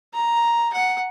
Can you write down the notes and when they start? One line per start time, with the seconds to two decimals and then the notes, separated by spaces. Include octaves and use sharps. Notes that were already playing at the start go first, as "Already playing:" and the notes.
0.14 A#5
0.73 F#5